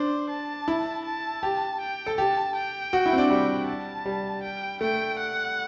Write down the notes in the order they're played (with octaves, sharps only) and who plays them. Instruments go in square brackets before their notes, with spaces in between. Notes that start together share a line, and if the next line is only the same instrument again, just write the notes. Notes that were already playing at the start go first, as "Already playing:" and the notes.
Already playing: [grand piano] D4 [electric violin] C5
[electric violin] A5
[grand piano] E4
[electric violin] A5
[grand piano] G4
[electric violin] G5
[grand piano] A4
[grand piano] G4 [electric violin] A5
[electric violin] G5
[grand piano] F#4
E4
C4
D4
[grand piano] G3 [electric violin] G5
[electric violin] A5
[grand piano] G3
[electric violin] G5
[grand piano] A3 [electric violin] G5
[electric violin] F#5